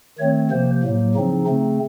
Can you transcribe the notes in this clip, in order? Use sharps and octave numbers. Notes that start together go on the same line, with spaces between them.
D#3 A3 C4 C#5
C3 F3 A#3 C5
A2 F#3 A#3
C#3 F3 C4 D#4
C#3 A3 C4